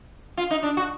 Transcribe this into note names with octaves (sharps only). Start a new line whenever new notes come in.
F4
D#4
D4
F#4